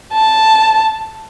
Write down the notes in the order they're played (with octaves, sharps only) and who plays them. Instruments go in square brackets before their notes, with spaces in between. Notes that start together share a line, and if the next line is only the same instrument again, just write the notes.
[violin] A5